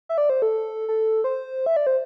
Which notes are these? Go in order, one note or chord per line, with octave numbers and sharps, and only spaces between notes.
E5
D5
C5
A4
A4
C5
E5
D5
C5